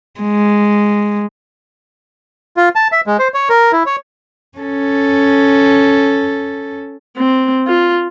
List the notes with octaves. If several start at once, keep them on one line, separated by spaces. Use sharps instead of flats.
G#3
F4
A5
E5
G#3
C5
C#5
A#4
E4
C#5
C#4 A4
C4
F4